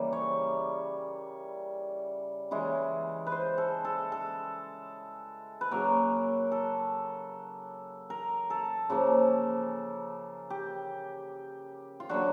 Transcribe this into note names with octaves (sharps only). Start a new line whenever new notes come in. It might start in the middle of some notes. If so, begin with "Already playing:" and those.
Already playing: C#3 E3 G3 A#3
C#5
C#3 E3 G#3
B4
C5
A4
A4
A4
B4
C#3 F#3 A#3 A#4
A4
A#4
A4
C#3 F3 A#3
G4
F4
D3 F#3 A#3 F#4